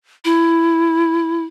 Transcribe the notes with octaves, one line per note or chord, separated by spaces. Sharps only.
E4